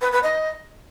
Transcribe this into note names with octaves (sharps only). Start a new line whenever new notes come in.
B4
B4
D#5